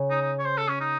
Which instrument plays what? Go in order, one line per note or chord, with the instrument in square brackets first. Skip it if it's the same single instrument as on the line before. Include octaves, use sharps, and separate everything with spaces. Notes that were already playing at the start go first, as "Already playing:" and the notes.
Already playing: [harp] C#3
[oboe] D#4
D#4
C#5
C5
A4
C#4
D#4